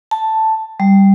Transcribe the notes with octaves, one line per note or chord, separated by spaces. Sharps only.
A5
G3